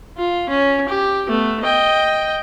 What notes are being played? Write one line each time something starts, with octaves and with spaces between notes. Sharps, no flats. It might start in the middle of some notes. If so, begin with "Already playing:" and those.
F4
C#4
G4
A3 B3
D#5 G5